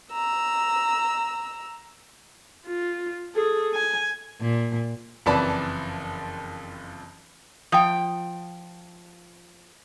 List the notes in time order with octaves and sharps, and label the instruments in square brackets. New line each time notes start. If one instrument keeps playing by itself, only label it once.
[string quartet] A#5 E6
[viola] F4
G#4 A4
G#5
[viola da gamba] A#2
[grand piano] F#1 F2 E3 D5 A5 B5
[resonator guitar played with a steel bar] F3 G5